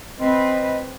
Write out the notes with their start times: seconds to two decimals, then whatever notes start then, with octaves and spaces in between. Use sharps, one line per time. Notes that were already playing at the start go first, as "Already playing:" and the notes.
0.19 C4 B4 D#5